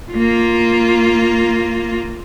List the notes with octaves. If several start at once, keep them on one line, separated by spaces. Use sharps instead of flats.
A#3 F4